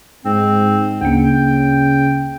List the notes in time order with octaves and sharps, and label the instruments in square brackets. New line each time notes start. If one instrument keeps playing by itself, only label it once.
[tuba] G#2 [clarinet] C4
[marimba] D2 A#3 [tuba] C#3 [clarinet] G5